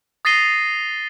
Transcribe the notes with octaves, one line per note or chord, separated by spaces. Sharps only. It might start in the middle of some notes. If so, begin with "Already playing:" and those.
D#6 A6 A#6 C7 D#7 G7